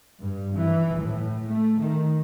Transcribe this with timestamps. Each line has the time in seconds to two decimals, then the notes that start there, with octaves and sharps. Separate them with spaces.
0.20 G2
0.55 E3
0.99 A2
1.46 A3
1.80 D#3